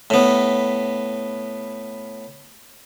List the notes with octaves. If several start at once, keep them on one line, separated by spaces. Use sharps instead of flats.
A2 B3